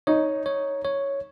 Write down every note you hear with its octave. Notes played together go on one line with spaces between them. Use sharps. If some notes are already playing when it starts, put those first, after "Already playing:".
D#4 C#5
C#5
C#5